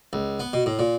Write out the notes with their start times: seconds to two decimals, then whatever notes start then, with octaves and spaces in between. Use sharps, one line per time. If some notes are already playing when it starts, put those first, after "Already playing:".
0.13 C#2
0.40 B3
0.53 B2
0.66 A2
0.79 A#2